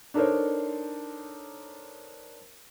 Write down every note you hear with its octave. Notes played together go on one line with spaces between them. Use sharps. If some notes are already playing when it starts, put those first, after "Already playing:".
D4 D#4 A4 A#4 C5 C#5